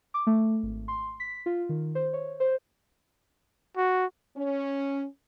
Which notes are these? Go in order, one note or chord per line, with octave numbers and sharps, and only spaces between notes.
D6
A3
G#1
C6
B6
F4
D#3
C5
C#5
C5
F#4
C#4